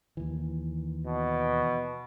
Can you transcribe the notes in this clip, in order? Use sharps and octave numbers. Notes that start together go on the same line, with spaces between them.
D#2 E3
B2